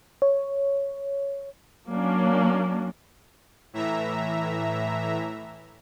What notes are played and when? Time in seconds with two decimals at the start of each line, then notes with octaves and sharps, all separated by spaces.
0.22 C#5
1.90 F#3 A#3 C#4 D4
3.73 A2 E3 E5 A#5